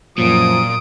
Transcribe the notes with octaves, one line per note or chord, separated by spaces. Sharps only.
F#2 A#2 F3 D#6 D7